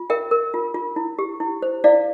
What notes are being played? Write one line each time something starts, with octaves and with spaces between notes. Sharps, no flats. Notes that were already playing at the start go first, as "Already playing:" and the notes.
Already playing: F4
A#4 E5 G5
A#4
F4
F4
E4
G4
E4
C5
E4 D5 F5